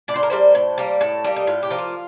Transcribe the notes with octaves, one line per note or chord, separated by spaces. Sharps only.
A2 D5
C5
A#4
G3 A#3 C5
A2
G3 A#3
A2 A4
G3 A#3
D#4
A2 F4
G4
F3 A#3
F4